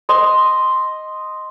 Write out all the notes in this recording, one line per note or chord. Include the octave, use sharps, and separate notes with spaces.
D#5 C6